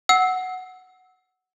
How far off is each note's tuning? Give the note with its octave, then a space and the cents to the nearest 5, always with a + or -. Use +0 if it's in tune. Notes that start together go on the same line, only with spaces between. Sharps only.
F#5 +0 E6 -20